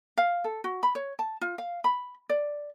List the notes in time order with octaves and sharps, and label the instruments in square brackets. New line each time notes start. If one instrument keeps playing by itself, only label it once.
[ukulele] F5
A4
F#4
B5
C#5
A5
F4
F5
B5
D5